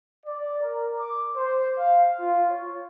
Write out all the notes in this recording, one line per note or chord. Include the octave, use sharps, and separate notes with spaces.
D5
A#4
D6
C5
F5
F4
C#5